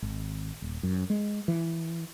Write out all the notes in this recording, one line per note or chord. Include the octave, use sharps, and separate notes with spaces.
G#1
D#1
F#2
G#3
E3